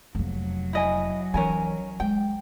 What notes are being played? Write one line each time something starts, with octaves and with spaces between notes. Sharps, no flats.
F1 F#3 A#3
E4 D#5 G#5
E3 C#4 D#4 A#4 G#5
G#3 G5